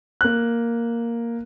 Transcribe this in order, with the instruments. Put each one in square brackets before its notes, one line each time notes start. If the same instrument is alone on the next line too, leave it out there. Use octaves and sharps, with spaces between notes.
[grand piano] A#3 F#6